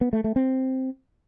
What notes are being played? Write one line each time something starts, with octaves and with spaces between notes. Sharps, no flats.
B3
A3
A3
C4